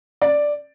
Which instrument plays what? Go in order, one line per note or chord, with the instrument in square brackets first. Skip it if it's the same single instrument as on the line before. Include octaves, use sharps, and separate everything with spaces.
[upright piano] D5